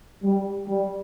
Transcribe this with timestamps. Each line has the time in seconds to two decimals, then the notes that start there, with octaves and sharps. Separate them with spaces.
0.23 G3
0.68 G3